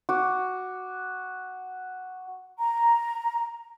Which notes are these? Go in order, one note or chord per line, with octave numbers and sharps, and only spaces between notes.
F#4 D6
A#5